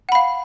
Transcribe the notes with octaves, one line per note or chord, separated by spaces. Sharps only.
F5 F#5 B5